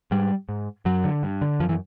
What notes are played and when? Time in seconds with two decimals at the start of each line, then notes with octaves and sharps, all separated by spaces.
0.11 G#2 G3
0.49 G#2
0.85 F#2 F#3
1.04 D3
1.23 G2
1.41 D3
1.60 F#2 F3
1.69 E3